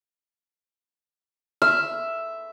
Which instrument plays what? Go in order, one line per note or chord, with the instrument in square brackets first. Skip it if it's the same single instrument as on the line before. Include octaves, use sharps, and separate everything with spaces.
[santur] E5 [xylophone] F6